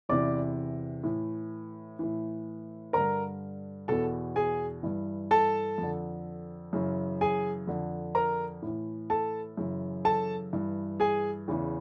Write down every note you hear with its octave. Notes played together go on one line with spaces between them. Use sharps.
E2 C3 E3 D5 D6
A2 E3
A2 E3
G2 D3 A#4 A#5
E2 B2 A4 A5
G#4 G#5
G2 E3
A4 A5
F2 D3
F#2 C#3 E3
G#4 G#5
F2 D3
A#4 A#5
A2 E3
A4 A5
F#2 C#3 E3
A4 A5
G2 E3
G#4 G#5
E2 C#3 E3